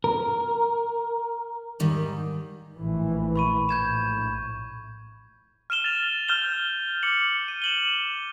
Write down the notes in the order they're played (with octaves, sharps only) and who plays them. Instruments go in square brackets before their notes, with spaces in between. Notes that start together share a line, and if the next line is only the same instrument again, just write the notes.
[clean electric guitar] A#4
[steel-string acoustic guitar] G#2 D#3 G3
[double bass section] A#1 A2 E3
[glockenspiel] B5 C#6 D#7
[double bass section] A#1 A2 [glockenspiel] G6 G#6 E7
[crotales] F6 D#7 E7 G7
A6 F7
F6 G6 E7 G7
D6 C#7 F#7
D#7
E7 F#7 G7